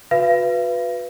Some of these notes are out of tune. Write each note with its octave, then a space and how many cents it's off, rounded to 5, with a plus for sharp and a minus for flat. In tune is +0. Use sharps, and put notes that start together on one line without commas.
F#4 -35 B4 +0 F5 -45